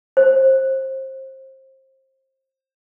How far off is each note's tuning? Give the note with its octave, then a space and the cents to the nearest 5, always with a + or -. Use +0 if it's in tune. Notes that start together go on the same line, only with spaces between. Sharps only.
C5 +25